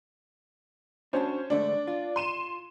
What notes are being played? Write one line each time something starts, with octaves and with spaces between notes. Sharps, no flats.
C#4 D4 F#4 C5 A5
G#2 D3 A3 D4
F4
C6 D#7 E7